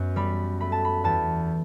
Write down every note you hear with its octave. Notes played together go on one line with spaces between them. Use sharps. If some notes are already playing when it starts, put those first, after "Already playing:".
Already playing: F#2 B3
G3 B5
A3 B5
A5
B5
E2 A5